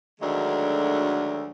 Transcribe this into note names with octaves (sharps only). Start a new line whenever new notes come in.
D2 D#3 F#3 G#3 A3 D4